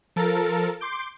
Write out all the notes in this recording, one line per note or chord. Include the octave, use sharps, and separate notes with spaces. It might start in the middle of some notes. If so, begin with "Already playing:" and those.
F3 A4 A#4 A6
C6 D6 G6 D7